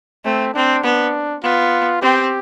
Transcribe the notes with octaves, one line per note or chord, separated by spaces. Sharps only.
A3 C4
C4 D4
B3 D4
B3 F4
C4 G4